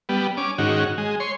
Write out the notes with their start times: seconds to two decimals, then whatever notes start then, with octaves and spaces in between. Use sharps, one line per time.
0.09 G3 B3
0.37 C#4 D6
0.58 G#2 D#3 C#4 F#4
0.98 G#3
1.20 C#5 C6